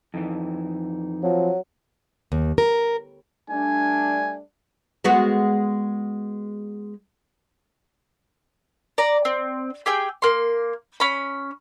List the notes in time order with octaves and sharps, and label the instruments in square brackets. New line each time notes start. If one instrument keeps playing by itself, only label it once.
[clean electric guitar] F2 E3 [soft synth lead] D#4
[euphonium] F3 [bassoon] F#3 [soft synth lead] C4
[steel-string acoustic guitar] D#2
A#4
[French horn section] G3 A3 D4 [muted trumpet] G#5
[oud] G#3 B3 F#4
[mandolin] D5 A#5
C4
G4 G#4 G5 E6
A#3 C6
C#4 B5